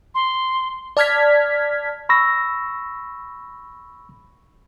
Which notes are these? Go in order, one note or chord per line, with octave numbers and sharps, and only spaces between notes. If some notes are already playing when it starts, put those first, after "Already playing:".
C6
D5 A5 F6 G#6 B6
B5 C#6 E6 A#6